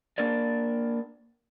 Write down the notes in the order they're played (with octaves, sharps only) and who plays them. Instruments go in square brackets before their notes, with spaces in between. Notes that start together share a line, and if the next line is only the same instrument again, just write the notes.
[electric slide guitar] A#3 D4 A#4 D5